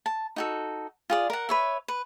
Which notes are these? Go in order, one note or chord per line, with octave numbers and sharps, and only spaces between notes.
A5
D#4 F#4 A4
F4 G#4 D5
A#4 F#5
B4 C#5 E5
B4